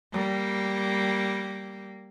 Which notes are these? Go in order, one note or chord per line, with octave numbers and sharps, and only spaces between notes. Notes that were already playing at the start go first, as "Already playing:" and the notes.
G3 A#3